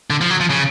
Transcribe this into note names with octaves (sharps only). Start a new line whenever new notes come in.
D3
F3
F#3
F3
C#3